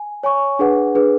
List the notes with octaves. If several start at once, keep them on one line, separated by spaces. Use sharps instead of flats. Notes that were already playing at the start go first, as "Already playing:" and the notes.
Already playing: G#5
C#5 G#5 C#6
D4 G#4 B4 F#5
D4 G#4 B4